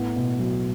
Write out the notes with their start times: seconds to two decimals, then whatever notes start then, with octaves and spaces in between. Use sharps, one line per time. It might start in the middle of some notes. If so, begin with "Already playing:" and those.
Already playing: A2 B3
0.16 B2
0.39 F#3